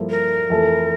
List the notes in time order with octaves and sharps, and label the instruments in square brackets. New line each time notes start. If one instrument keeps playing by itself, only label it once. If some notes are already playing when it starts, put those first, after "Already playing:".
Already playing: [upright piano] G2 F3 A#3 E4 A4
[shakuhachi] A#4
[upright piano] F2 E3 A3 E4 A4